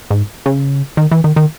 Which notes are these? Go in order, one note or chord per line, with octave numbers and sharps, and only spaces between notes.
G#2
C#3
D#3
E3
D#3
D#3